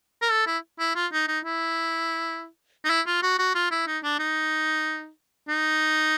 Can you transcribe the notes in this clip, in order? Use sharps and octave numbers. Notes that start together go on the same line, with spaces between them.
A#4
A4
E4
E4
F4
D#4
D#4
E4
D#4
E4
F4
F#4
F#4
F4
E4
D#4
D4
D#4
D#4